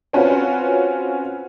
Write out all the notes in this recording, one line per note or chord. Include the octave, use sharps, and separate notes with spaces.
C4 C#4 F4 F#4 B4